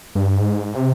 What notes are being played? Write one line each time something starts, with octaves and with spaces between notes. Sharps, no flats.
G2
G#2
C3